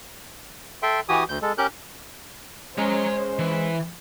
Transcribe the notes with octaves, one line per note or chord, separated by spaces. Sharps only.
A4 E5 G5 C6
E3 F#4 G4 G#5 D#6
D2 G6
G#3 A4
C#4 G4 A#4 F#6 G6
G#3 C#4 C5 C#5 A#5
E3